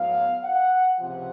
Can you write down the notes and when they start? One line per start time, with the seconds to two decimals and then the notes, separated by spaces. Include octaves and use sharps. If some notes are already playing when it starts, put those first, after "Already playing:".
Already playing: A2 F#3 B3 F5
0.44 F#5
0.99 C#2 C3 F3 F#5